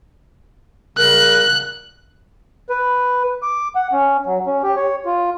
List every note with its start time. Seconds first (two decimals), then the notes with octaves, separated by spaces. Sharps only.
0.97 C#3 G3 A#4 F#6
2.69 B4
3.43 D6
3.75 F#5
3.92 C#4
4.26 F#3
4.46 C#4
4.63 G4
4.76 C#5
5.05 F4